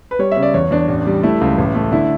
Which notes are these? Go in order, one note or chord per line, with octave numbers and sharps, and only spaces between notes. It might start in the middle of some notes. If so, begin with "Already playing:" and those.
B4
G3 C#5
C#3 E5
D5
E2 C#5
E2 D4
A1
G3
A3 E4
C#2
A1
A3
D3 E4